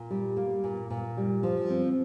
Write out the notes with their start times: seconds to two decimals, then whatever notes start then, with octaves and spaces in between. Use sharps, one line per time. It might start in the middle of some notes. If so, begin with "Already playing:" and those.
Already playing: A#2
0.10 G3
0.37 A#3
0.64 A#2
0.90 A#2
1.17 G3
1.43 F3
1.70 C4